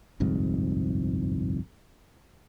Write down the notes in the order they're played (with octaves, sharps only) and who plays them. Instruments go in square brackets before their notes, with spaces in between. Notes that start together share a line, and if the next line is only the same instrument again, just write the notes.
[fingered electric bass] G1 C2 F2 G#2